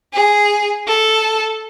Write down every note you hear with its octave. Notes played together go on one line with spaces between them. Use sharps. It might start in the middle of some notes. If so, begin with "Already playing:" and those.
G#4
A4